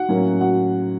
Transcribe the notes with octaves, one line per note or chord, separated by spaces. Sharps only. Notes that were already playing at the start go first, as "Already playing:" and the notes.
Already playing: F#4 F#5
A2 F#3 A#3 C#4
F#4 F#5